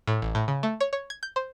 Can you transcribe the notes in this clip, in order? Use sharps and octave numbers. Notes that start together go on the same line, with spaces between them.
A2
A1
A2
C#3
A3
C#5
C#5
G#6
G6
C5